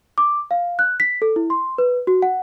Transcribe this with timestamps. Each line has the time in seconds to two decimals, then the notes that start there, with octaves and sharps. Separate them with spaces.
0.18 D6
0.51 F5
0.79 F#6
1.00 B6
1.22 A4
1.36 E4
1.50 C6
1.78 B4
2.07 F#4
2.22 F#5